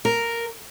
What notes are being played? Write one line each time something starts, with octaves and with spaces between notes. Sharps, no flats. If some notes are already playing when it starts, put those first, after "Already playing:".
A#4